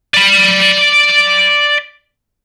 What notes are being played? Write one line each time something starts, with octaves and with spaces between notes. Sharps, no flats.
D5 B5